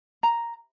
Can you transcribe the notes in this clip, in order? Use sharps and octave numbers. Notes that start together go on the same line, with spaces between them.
A#5